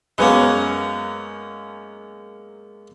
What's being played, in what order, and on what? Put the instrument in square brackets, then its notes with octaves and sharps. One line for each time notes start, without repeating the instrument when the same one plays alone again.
[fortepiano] F#2 B3 C#4 [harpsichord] G#3 A#3